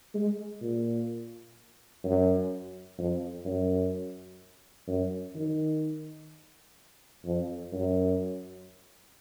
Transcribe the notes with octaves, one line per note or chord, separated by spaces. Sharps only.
G#3
A#2
F#2
F2
F#2
F#2
D#3
F2
F#2